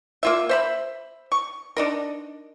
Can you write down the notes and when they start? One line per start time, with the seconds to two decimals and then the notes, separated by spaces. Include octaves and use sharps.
0.23 A#3 F4 E5
0.49 C5 E5 B5
1.32 C#6
1.77 D4 D#4 A#4